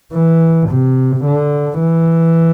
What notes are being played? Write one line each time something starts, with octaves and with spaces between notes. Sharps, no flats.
E3
C3
D3
E3